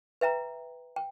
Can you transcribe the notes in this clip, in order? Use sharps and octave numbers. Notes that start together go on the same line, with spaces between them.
B4 E5 G5 A#5
G5